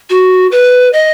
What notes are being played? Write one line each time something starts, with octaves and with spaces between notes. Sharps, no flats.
F#4
B4
D#5